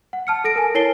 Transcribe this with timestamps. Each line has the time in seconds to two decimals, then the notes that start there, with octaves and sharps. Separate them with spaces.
0.13 F#5
0.27 A5 F6 C#7
0.44 A4 A#6 D7
0.56 A#4 G#5
0.75 E4 A#4 C#5 C7 D7 G7